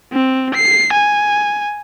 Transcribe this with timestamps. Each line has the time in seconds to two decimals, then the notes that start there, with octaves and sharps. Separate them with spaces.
0.13 C4
0.54 C7
0.93 G#5